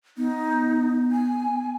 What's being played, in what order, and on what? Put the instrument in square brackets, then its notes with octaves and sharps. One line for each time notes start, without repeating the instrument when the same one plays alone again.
[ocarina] B3 [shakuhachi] D#4
[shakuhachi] G#5